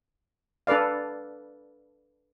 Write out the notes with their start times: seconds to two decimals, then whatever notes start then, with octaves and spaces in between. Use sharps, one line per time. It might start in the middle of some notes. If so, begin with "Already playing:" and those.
0.67 D4 A4 B4 D5 F5